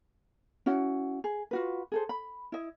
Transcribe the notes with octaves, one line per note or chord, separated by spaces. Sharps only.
C#4 E4 F#4 F#5
G#4
F4 F#4 B4
G#4 A4 C5
B5
E4 D#5